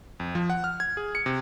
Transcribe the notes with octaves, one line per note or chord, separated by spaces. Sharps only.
F2
F3
F#5
F6
G#6
G#4
C#7
C3